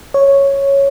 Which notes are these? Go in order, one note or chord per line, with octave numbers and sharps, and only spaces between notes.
C#5